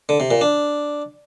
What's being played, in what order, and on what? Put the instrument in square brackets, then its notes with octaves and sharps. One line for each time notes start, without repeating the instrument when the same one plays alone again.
[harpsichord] D3
C3
A#2
D4